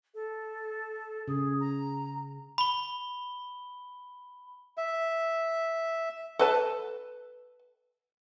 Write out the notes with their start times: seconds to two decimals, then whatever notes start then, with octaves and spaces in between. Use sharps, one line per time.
0.14 A4
1.28 C#3 G#4
1.60 A#5
2.58 B5 G7
4.77 E5
6.39 A4 B4 A5